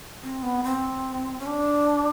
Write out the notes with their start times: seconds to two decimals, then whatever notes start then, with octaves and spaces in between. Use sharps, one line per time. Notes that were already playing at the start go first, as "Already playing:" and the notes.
0.23 C4
0.43 B3
0.64 C4
1.39 C#4
1.46 D4